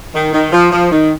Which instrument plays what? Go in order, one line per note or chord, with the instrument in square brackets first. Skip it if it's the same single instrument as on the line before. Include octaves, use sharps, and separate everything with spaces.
[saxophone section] D#3
D#3
F3
F3
D#3